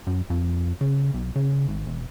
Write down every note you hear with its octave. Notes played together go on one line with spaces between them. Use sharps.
F#2
F2
C#3
B1
C#3
G#1
E1